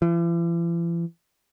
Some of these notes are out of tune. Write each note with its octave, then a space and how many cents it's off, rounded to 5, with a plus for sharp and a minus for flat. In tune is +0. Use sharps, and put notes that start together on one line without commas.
E3 +45